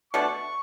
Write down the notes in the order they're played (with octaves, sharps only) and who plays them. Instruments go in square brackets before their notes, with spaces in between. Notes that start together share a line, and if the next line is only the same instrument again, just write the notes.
[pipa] B2 A3 D4 [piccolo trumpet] C#6